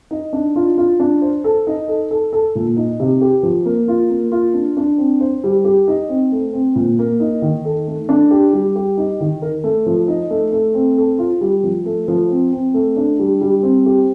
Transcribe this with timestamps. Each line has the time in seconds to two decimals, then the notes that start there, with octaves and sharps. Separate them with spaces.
0.11 D#4
0.33 D4
0.56 F4
0.78 F4
1.00 D4
1.22 C5
1.44 A4
1.67 D#4
1.88 A4
2.11 A4
2.33 A4
2.55 A#2
2.77 D#4
3.00 C3
3.21 G4
3.43 F3
3.66 A#3
3.88 F4
4.10 A#3
4.32 F4
4.54 D4
4.77 D4
4.98 C4
5.20 C5
5.44 G3
5.65 G4
5.88 D#4
6.09 C4
6.32 A3
6.53 C4
6.75 A#2
6.99 A#3
7.20 D#4
7.42 D#3
7.65 A4
7.87 A3
8.09 D4
8.31 G4
8.53 G3
8.76 G4
8.98 D#4
9.20 D#3
9.42 A#4
9.64 A3
9.86 F3
10.08 D#4
10.30 A3
10.52 A3
10.74 C4
10.98 A4
11.19 F4
11.41 G3
11.64 F3
11.86 A3
12.08 F3
12.31 C4
12.53 C4
12.74 A3
12.97 D4
13.19 G3
13.41 G3
13.63 C4
13.86 G4